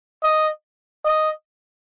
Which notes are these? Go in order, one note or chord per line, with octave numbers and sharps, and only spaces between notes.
D#5
D#5